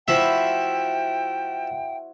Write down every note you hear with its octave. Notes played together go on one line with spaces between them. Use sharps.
F3 E4 F#4 C5 E5 G5